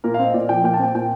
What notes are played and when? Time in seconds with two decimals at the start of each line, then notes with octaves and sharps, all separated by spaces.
0.04 A#2 A#4
0.14 F5
0.19 C4 D#5
0.34 A#2 D5
0.49 F3 G5
0.64 A#2 G5
0.74 A5
0.79 C4 G5
0.95 A#2 G5